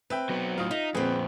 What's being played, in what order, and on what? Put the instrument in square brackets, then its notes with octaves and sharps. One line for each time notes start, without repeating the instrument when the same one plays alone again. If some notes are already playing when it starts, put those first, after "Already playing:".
[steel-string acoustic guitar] C4 [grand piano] B4 E5 G5
[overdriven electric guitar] F#3 B3
[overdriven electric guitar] A2 F#3 [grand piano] F4 D#6
[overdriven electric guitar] D#4 [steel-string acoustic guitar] E5
[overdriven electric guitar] F2 A#2 [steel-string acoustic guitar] B3 C4 [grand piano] G#4 B4